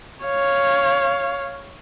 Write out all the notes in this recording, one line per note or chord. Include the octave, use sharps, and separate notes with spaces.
C#5 F5